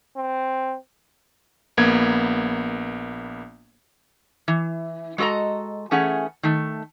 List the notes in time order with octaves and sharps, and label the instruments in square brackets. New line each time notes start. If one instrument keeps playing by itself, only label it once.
[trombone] C4
[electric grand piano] A#1 A#3 B3 G#6
[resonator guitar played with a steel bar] E3
G#3 F#4 A4 D#5 A#5
E3 A3 C#4 G#4 F#5
D#3 A3